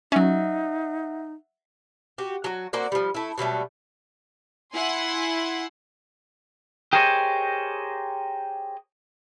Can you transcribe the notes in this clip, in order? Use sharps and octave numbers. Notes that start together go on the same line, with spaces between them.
F#3 C#4 D#4 E5 F#5
F#4 G4
F#3 F#4
A#3 C4 F#4 D5
F3 G3
A3 E4
B2 F#3 G3 A3
E4 F#5 G#5 C6
G4 G#4 A#4 C5 C#5 D#5